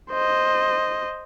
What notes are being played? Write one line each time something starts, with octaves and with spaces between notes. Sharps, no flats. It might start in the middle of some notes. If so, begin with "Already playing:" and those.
C5 D#5